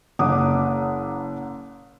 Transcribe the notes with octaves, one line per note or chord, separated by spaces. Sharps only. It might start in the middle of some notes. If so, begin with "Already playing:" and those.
F#1 F#5 D6 D#6